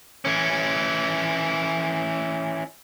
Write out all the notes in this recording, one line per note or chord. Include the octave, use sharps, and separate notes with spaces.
E3 C#4